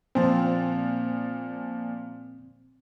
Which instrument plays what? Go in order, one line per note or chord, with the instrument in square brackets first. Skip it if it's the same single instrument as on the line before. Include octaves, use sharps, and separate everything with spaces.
[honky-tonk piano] A#2 F3 [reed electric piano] C4